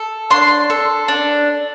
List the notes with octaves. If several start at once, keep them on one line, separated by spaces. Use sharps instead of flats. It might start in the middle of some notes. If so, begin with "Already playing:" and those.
Already playing: A4
D4 C6
A4
D4